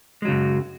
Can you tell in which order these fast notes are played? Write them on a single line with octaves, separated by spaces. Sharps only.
G#3 F#3 C#3 F#2